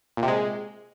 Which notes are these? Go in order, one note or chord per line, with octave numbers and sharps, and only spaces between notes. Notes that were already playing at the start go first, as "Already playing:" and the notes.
A#2
C3
G#3